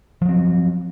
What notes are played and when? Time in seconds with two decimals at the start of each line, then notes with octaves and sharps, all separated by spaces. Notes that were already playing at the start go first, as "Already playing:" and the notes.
0.22 F3
0.25 F#3
0.29 C4